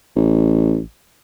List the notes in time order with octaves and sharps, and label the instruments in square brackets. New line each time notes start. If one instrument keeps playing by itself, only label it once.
[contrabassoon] A1